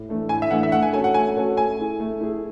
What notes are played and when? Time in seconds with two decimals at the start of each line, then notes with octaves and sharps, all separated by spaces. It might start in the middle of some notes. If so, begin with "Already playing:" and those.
Already playing: A2
0.09 E3 A3 D4
0.29 A2 G#5
0.42 E5
0.51 E3 A3 D4 F#5
0.63 E5
0.72 A3 F#5
0.82 G#5
0.93 C#4 F#4 A4 G#5
1.04 F#5
1.14 A3 G#5
1.36 C#4 F#4 A4
1.57 A3 G#5
1.78 E4 G#4
2.00 A3
2.20 E4 G#4